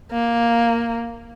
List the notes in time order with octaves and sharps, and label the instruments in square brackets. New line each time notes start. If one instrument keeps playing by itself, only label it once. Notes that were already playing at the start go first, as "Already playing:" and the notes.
[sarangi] A#3